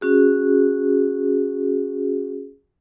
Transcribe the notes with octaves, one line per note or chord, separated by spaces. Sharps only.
C#4 F#4 G#4